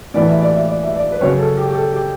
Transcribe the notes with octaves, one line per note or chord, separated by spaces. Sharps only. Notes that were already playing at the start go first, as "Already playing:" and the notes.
A2 E3 B3 D5
E5
D5
E5
D5
E5
D5
B4
F#2 C#3 F#3 C#5
A4
G4
G4
A4
G4